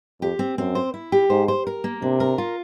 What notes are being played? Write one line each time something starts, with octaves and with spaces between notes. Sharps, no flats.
F2 G4
C4
F#2 C4
C5
E4
G4
G#2 C5
C5
A#4
A#3
C3 D4
A#4
F4